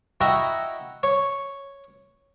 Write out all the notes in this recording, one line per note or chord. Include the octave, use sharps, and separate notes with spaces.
E4 F#4 D#5 G5 A#5
C#5